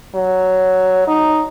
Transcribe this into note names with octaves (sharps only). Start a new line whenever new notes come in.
F#3
D#4